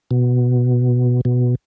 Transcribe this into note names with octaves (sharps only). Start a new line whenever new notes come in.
B2
B2